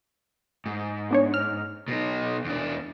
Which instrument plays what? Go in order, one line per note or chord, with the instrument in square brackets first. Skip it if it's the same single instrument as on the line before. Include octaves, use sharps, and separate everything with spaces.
[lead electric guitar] G#2
[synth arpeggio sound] B3 D4 C#5
F6
[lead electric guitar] B2 D#4
E2 D4